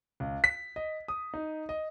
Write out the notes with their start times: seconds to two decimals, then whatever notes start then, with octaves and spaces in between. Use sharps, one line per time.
0.20 C#2
0.44 B6
0.76 D#5
1.08 D#6
1.34 D#4
1.69 D#5